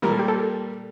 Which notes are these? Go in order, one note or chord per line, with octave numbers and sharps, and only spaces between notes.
A#2 G3 A#3 A#4
A4
G4
A4